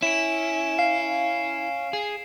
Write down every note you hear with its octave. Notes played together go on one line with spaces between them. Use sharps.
C#4 E4 D7 E7
F5 C7
G#4